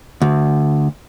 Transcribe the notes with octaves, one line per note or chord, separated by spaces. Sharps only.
D2